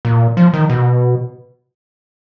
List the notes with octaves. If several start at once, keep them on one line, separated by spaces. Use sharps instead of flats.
A#2
F3
D#3
B2